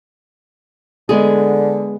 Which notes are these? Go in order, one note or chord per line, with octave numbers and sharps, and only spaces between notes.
D3 G#3 B3 G#4